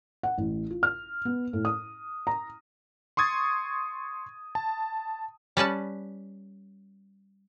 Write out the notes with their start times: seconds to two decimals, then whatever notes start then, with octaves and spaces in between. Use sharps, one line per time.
0.23 F#5
0.38 A1
0.70 F4
0.83 F6
1.25 B3
1.53 A2
1.65 D#6
2.27 A#5
3.17 C6 C#6 D#6 G#6 A6
4.55 A5
5.57 G3 C#4 B4 A5